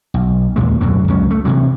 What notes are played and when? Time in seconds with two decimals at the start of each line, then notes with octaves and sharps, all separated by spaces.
0.14 B1
0.56 D#2 A#2 G#3
0.81 D1 F#2 B2 D3
1.08 C#2 F#3 C#4
1.31 A3
1.45 C3 E3 F#3